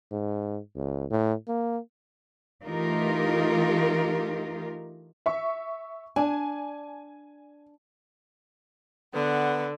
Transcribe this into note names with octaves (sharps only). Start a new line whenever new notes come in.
G#2
C#2
A2
A#3
E3 A3 D#4 F4 G4 A#4
E5 C#6
D4 G#5
D3 B3 F#5